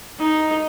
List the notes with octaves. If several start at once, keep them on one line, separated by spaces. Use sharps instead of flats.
D#4